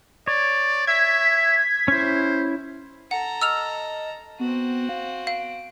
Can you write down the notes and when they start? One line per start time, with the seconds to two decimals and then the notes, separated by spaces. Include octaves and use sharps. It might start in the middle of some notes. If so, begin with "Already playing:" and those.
0.27 C#5 D5
0.87 E5 G#6 B6
1.88 C#4 E4 C5
3.11 A4 F#5 A#5
3.41 D#5 E6 F6 F7
4.40 B3 C4 F#4
4.89 F5
5.27 F5 D7